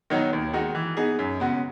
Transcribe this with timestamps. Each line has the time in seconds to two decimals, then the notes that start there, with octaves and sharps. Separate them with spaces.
0.10 D#3 F#3 B3 D#4
0.33 D#2
0.53 D#3 G#3 D#4 F#4
0.75 E3
0.97 B3 D#4 G#4
1.19 F#2
1.40 C#3 G#3 B3 F#4